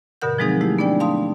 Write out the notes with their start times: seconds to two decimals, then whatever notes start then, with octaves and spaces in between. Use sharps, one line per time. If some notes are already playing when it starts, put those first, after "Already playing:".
0.22 G2 B2 D3 A#4 F#5 G6
0.38 F3 F#3 G#3 C4 D#4 G#4
0.61 G#3 A3 E4 G4
0.79 B3 D4 D5 G5
1.00 F5 A5 C6 D#6